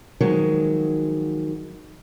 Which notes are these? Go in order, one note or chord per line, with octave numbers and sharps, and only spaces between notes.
D#3 F3 F#3 G#3